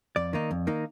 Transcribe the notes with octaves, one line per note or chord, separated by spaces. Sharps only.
F2 D5
D#3 A#3 D#4
F2
D#3 A#3 D#4